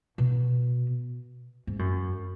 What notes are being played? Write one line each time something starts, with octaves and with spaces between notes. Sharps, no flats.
B2
G#2
F#2